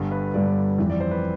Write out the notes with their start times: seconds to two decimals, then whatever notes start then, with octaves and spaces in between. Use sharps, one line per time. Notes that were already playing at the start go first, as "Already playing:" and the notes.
Already playing: G1 G2 D3 G3
0.12 B4
0.34 G1 G2 D3 G3 D5
0.78 F2 E3 G3
0.90 D5
1.00 C5
1.11 B4